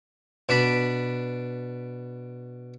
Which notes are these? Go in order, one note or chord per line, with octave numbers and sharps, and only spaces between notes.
B2 D4 D5 B5